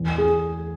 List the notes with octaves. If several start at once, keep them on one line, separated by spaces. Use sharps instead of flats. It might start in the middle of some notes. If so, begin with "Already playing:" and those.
Already playing: E2
G#4